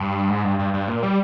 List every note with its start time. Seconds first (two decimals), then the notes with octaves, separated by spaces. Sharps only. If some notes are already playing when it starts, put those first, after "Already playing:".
Already playing: G2
0.29 G#2
0.44 G2
0.59 G2
0.74 G2
0.88 A#2
1.03 G3